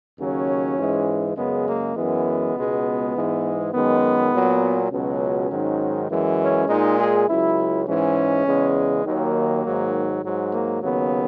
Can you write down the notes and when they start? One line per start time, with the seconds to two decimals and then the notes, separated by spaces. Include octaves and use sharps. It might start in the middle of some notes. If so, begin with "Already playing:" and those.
0.19 D#2 C#3 F#3 C#4
0.77 G#2 E3 G#3
1.37 F#2 C#3 G#3 B3
1.66 A#3
1.96 F#2 E3 G#3 B3
2.55 C#2 B2 G#3
3.14 G#2 E3 G#3
3.73 F#2 D#3 G#3 B3
4.32 A#2 F#3
4.91 C#2 B2 F#3 C#4
5.50 G#2 D#3 F#3
6.10 F#2 E3 G#3
6.39 C#4
6.69 A#2 G#3 D#4
6.98 G#4
7.28 C#2 C#3 F#3 E4
7.87 G#2 E3 G#3 C#4
8.46 E2 C#3 G#3
9.05 D#2 D#3 F#3 A#3
9.65 G#2 D#3 F#3
10.24 G#2 F#3
10.52 A#3
10.82 D#2 C#3 F#3 B3